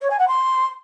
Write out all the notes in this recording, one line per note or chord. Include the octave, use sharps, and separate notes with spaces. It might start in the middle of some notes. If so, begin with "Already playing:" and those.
C#5
G#5
F#5
C6